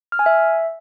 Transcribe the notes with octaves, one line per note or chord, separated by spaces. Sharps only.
F6
G#5
E5